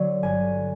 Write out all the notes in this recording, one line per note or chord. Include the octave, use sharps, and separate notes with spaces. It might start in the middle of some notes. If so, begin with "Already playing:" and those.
Already playing: D3 F#3
G1 G#5